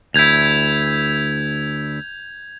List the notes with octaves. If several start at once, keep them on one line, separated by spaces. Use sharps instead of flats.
D2 E4 G6 G#6 F7